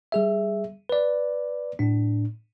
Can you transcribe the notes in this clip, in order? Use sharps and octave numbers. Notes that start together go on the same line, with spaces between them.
G3 G#4 E5
B4 D5
A2 D4